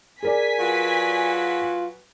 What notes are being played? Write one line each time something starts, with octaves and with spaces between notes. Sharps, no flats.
G#4 A#4 D5 G#5 B6
F#3 F4 F#4 B4